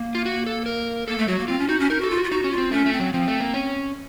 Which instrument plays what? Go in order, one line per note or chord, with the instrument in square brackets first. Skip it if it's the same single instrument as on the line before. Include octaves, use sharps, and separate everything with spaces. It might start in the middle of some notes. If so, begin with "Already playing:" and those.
Already playing: [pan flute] A#3
[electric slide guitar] F4
F#4
A4
A#4
[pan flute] A#3 [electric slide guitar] A4
[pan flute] A3
[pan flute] F#3 [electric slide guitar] F#4
[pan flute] A#3
[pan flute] C4 [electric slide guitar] F4
[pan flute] C#4
[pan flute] D#4 [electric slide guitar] F#4
[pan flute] C#4
[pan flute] D#4 [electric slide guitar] A#4
[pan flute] F#4 [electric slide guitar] A4
[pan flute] F4
[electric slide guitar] F#4
[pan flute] F4
[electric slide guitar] D#4 [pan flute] F#4
[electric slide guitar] C#4
[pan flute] F4
[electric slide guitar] C4
[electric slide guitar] A3 [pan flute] C#4
[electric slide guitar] A3
[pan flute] C4
[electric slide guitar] F#3
[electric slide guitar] F3 [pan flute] C4
[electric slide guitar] A3
A#3
C#4